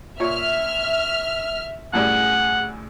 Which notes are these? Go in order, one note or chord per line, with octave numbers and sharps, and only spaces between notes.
A#2 C#5 E5 F6
F#2 A2 G3 G#4 F#5